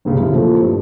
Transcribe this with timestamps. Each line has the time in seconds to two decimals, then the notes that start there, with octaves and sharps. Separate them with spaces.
0.05 G1 C#2 A#2 C#3 G3
0.20 G1 D#2 C3 E4
0.33 A#2 E3 F3 A3
0.60 G2